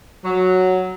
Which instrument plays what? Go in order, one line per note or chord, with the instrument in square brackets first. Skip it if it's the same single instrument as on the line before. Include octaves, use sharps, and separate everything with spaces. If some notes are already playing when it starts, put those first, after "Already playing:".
[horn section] F#3